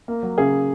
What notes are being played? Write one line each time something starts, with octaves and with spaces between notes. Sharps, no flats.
A#3
F#3
C#3 G#4